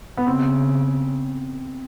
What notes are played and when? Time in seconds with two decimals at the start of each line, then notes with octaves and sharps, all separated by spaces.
0.17 B3
0.27 C#3 C4